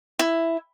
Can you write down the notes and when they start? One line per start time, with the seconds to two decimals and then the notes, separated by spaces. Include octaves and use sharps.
0.19 E4